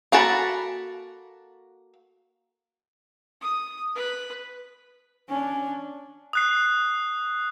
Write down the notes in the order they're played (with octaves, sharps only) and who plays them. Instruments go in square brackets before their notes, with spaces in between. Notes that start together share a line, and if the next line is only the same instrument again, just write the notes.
[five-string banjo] A#3 F#4 A4 A5 B5
[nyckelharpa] D#6
B4
[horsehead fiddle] C#4 D4
[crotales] D#6 F#6 C7